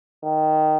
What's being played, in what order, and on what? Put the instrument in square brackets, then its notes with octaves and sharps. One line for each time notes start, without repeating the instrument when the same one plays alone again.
[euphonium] D#3